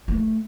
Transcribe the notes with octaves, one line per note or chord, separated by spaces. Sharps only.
A3